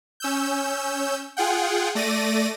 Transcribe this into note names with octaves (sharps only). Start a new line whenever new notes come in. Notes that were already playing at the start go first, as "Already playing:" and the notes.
C#4 E6 G6
F4 G#4 F#5 G5
A3 D5 A#6 D#7